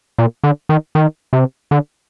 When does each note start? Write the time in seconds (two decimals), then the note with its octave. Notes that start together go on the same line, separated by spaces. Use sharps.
0.18 A#2
0.44 D3
0.69 D#3
0.95 D#3
1.33 C3
1.71 D3